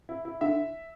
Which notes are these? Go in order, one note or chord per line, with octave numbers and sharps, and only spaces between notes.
E4
E4
D3 E5